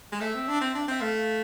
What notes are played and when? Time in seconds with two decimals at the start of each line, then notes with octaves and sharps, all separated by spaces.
0.12 G#3
0.20 A3 E5
0.34 C4
0.48 D4
0.61 C4
0.75 D4
0.88 C4 E5
1.01 A3 F5